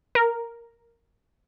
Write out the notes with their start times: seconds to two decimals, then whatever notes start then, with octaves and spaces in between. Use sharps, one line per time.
0.15 A#4